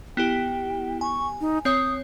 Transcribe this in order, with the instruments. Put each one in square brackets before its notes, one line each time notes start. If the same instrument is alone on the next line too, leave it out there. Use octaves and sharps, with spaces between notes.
[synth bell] B3 E4 G4 [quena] G5
[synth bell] G#5 [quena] C#6
[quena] D#4
[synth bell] C4 C#5 [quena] D#6